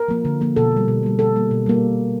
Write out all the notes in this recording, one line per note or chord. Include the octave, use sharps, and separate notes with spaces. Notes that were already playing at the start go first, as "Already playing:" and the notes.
Already playing: A#4
F3 A#3
D3
F3 A#3
B2 A4
G3 A#3
B2
G3 A#3
B2 A4
G3 A#3
B2
G3 A#3